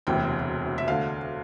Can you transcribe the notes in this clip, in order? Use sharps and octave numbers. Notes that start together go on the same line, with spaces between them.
E1 D2 C3 E3 G5
E5
D2 D3 F5